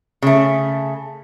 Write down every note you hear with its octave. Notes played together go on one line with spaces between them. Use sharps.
C#3 A3